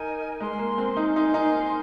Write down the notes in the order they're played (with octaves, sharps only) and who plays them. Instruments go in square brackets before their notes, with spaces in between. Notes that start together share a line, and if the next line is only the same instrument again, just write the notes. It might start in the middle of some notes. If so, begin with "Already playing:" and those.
Already playing: [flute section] D#4 A#4 D#5 G#5
[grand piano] G#3 [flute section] A#4 G#5 C6
[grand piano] A#3
C4
D#4
[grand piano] D#4 [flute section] A#4 G#5 C6
[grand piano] D#4